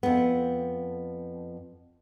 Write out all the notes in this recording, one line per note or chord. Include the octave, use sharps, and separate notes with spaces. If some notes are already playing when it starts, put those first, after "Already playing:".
F2 B3